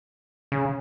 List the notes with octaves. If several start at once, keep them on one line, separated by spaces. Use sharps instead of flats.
C#3